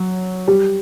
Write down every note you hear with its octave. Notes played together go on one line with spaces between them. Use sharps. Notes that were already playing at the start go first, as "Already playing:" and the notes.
Already playing: F#3
G3